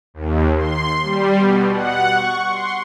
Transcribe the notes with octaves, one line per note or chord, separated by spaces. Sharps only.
D#2
C6
G3
B2
F#5
C#6
C6